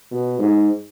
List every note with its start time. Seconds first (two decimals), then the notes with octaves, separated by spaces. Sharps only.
0.11 B2
0.39 G#2